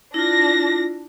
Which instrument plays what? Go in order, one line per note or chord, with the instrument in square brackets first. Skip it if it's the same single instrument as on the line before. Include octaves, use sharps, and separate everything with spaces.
[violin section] D4 A#6 [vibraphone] E4 F4